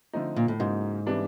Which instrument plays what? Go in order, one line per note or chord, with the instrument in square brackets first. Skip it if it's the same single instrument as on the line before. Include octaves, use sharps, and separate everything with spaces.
[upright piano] D3 F3 A3 C4 D#4
[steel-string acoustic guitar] A#2
A2
[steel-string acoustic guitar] G#2 [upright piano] C#3 F#3 A#3 D#4
[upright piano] C3 E3 G3 B3 D4